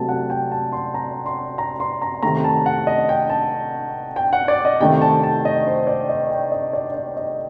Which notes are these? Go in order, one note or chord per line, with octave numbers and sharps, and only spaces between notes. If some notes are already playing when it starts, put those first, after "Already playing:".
Already playing: C3 F#3 A3 A5
F#5
G5
A5
C6
A#5
C6
A#5
C6
A#5
C3 D#3 A3 A#5
A5
F#5
D#5
G5
A5
G5
F#5
D5
D#5
C3 D#3 A3 G5
A5
A5
D#5
C5
D5
D#5
G5
D#5
D5
D5
D#5